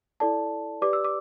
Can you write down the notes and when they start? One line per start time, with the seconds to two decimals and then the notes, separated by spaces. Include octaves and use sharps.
0.20 E4 A4 D5 A5
0.82 G4 B4 D5 D6
0.93 E6
1.04 D6